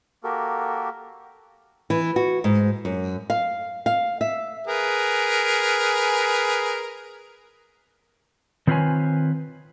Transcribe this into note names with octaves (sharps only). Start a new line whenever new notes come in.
A#3 F#4 G4 A4 A#4
E3
F#4
G#2
F#2
F5
F5
E5
G#4 A#4 B4
D#3 C4 F4 B4 C#5 G#5